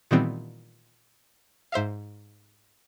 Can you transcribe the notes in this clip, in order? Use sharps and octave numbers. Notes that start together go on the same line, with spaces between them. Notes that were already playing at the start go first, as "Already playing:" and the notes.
A#2 D#3 E3 G3 B3 C4
G#2 C5 E5 F5